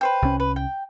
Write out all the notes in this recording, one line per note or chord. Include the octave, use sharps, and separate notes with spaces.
B4 C5 G5
C2 C#4
B4
G5